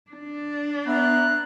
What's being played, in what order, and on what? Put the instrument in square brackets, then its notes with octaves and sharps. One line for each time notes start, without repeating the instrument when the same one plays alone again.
[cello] D4
[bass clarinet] B3 [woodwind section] E5 A#5 [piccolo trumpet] F#6